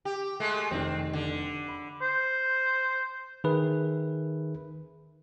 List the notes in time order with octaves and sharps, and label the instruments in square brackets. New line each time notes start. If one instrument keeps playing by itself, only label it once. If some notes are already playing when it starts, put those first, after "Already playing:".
[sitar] G4
G#3 A3
[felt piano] F1 D#3 [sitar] C4
[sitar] D3
[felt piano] B5
[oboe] C5
[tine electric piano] D#3 G#4 B4 E5